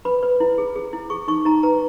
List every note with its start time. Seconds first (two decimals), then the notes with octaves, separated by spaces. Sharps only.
0.05 B4 B5
0.23 B4
0.40 E4
0.58 G#4
0.76 G#4
0.93 E4
1.10 G#4 C#6
1.28 D#4 C#6
1.45 D#4 A#5
1.63 B4 A#5